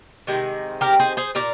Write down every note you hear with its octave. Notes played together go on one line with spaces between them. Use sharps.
C3 D#3 G#3
G4 A#4
G#4 C5
G#4 C5
A#2 G3 A#4 D5